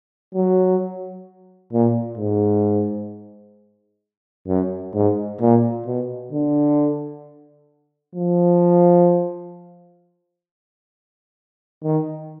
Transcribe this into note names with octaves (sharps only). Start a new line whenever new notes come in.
F#3
A#2
G#2
F#2
G#2
A#2
B2
D3
F3
D#3